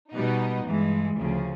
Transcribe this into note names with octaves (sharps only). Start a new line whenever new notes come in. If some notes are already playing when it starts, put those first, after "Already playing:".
B2 G3 B3 D#4
G2 E3 G#3
D2 C#3 F3